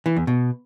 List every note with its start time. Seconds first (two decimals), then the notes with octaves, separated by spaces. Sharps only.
0.06 E3
0.17 E2
0.27 B2